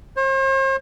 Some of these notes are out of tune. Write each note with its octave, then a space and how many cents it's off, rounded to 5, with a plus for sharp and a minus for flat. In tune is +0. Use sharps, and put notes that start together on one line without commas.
C5 +45